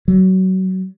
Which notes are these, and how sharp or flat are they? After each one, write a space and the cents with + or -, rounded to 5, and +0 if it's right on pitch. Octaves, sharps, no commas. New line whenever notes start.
F#3 +20